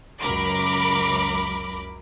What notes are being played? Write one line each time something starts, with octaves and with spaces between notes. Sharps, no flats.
C#2 F#2 A#4 B5 D6